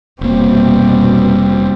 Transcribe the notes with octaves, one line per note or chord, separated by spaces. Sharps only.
F1 B2 G3 A#3 C4